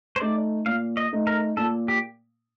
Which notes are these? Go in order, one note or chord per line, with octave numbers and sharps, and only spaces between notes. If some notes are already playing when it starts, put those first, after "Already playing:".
C5
A3 D#4 D5
A#2 F5
D#5
A3 D#4
A#4
A#2 A4
G4